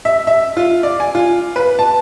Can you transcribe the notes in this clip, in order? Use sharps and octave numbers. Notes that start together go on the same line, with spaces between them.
E5
E5
F4
D5
G#5
F4
B4
A5